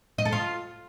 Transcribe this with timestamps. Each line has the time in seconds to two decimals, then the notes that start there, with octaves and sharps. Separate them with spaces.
0.18 D#5
0.25 A4
0.32 F4